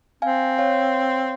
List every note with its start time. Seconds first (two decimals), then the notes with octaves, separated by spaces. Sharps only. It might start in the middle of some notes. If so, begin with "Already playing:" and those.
0.22 C4 F5 G#5
0.59 C#5 F5